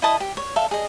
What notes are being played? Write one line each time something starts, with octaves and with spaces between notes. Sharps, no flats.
E4 D#5 A5 D#6
G4
C#5
A4 E5 F5
G#4 D#5